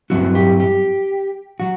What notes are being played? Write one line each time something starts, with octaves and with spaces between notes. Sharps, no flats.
G2 F#3 C4 E4 F#4
G4
G4
F#3 F#4